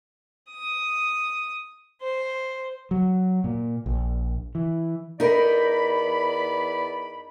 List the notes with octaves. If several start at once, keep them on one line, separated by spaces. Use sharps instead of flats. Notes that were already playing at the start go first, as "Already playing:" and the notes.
D#6
C5
F#3
A#2
A#1
E3
E2 D#4 A#4 D5 B5